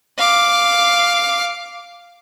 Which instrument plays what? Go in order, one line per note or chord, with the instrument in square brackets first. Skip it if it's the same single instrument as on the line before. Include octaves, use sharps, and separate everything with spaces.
[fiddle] F5 D6